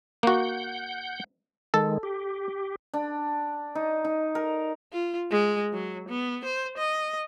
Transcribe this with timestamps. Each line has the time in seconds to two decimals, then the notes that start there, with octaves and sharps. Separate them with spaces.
0.23 A#3 F#4 F#5 G6
1.74 D#3 G#3 A4
2.03 G4
2.94 D4
3.75 D#4
4.05 D#4
4.35 A#4
4.93 F4
5.31 G#3
5.73 F#3
6.09 B3
6.45 C5
6.78 D#5